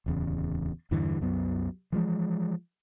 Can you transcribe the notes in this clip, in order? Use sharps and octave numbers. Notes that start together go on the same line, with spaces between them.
D1 E2 C#3
E2 G2 D3 E3
C2 F#2 F#3 B3
E3 F3 G#3